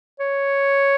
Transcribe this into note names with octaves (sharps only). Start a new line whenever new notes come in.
C#5